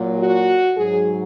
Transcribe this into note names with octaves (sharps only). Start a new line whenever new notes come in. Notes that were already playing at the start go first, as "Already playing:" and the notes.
Already playing: A#2 F#3
F#4
G#2 F#3 G#4